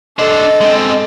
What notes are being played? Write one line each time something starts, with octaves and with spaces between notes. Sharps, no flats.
D4 A4 C5 D#5
G#3 C4